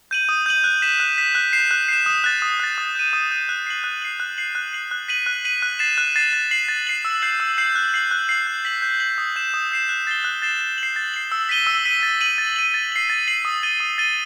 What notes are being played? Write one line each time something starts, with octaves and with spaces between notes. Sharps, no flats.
G6 D#7 F#7
D#6
G6 D#7 F#7
F#6
B6 E7
F#6
B6 E7
F#6
C7 E7
F#6
C7 E7
D#6
F#6 A6
D#6
F#6 A6
D#6
G6 D#7
D#6
G6 D#7
F#6
C7 F#7
F#6
C7 F#7
F#6
C7 F#7
F#6
C7 F#7
F#6
B6 D#7 F#7
F#6
B6 D#7 F#7
F#6
A6 C7 E7
F#6
A6 C7 E7
A6
C7 F#7
A6
C7 F#7
E6
G6 C7 F#7
E6
G6 C7 F#7
F#6
C7 F#7
F#6
C7 F#7
G6
B6 F#7
G6
B6 F#7
D#6
G6 C7 E7
D#6
G6 C7 E7
F#6
A6 C7 E7 G7
F#6
A6 C7 E7 G7
A6
F#7
C7
A6
C7 F#7
E6
B6 D#7 G7
E6
B6 D#7 G7
A6
D#7 F#7
A6
D#7 F#7
A6
C7 F#7
A6
C7 F#7
D#6
A6 D#7 G7
D#6
A6 D#7 G7